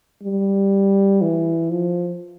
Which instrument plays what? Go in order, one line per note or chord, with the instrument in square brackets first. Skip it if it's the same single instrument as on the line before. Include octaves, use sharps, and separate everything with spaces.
[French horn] G3
E3
F3